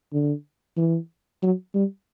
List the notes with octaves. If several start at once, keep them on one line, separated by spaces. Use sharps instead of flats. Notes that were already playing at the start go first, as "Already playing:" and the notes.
D3
E3
F#3
G3